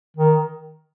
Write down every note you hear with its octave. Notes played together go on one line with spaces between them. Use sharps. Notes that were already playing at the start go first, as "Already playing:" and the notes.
D#3